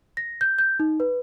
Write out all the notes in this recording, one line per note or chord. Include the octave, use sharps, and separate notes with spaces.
A#6
G6
G6
D#4
B4